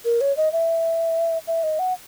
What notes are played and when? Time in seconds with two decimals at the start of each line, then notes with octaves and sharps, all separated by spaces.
0.05 A#4
0.21 C#5
0.37 D#5
0.53 E5
1.47 E5
1.63 D#5
1.79 F#5